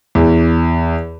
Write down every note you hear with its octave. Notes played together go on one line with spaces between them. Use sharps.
E2